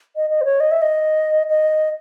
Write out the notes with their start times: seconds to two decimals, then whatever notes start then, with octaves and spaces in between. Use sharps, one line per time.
0.16 D#5
0.30 D#5
0.41 C5
0.45 C#5
0.60 D#5
0.71 E5
0.82 D#5
1.49 D#5